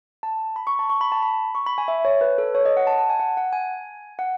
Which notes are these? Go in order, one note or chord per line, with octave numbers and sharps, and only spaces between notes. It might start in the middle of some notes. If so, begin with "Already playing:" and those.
A5
B5
C#6
A5
C#6
B5
A5
B5
C#6
B5
G#5
E5
C#5
B4
A4
C#5
D#5
F#5
A5
A5
G#5
F#5
F#5
G#5
F#5